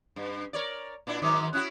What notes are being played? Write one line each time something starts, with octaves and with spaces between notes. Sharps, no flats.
G2
A#4 C#5 D5
A#2 D4 E4
G#2 D#3 F#3 A#5 D6 D#6
C#4 E4 F#4 D#6 F#6